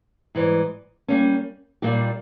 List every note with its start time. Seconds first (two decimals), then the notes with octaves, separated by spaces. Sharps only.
0.35 G#2 E3 G3
1.08 G3 A#3 C#4
1.82 A#2 G3 A#3 D#4 G4